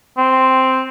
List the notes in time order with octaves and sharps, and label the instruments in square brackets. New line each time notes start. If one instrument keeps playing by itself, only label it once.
[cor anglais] C4